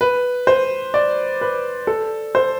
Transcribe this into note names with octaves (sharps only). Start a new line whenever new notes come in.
B4
C5
D5
B4
A4
C5